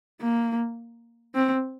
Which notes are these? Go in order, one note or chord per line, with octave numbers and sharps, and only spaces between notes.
A#3
C4